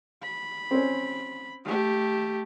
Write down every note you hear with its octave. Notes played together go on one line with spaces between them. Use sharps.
B5
C4 C#4
A3 G4